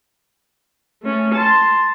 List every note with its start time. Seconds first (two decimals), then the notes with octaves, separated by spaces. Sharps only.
1.03 A3 C#4
1.34 A5 C6